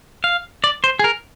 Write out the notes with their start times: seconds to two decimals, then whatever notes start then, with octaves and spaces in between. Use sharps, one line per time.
0.24 F5
0.64 D5
0.84 C5
0.99 G#4
1.04 A#4